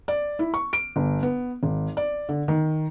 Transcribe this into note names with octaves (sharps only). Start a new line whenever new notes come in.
D5
E4
C#6
D7
G1
B3
G#1
D5
D3
D#3